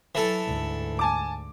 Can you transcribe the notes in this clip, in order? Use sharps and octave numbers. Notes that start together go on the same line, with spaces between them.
E3 F#3 A4
D2 G#2
G#5 A5 D6